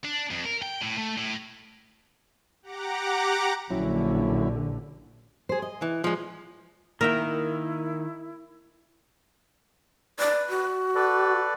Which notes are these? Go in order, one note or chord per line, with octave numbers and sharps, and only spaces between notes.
D4
F2
A#4
G5
A2
A3
A2
G4 F#5 A#5 D6
A#1 D3 F#3 C#4 E4
G#4 C5
D#5
E3
F3 G#3
D#3 A#3 E4 A#4 E5 G5
B4 D5
F#4
A4 B4 D5